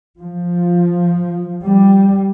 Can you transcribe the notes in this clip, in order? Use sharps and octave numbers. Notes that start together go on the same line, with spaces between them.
F3
G3